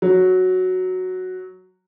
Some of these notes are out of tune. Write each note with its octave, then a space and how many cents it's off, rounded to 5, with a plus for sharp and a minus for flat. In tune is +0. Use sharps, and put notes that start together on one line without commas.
F#3 +0